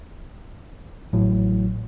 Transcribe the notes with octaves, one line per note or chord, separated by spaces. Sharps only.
A1 A2 F#3